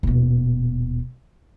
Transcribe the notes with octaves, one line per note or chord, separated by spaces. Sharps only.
D#1 B2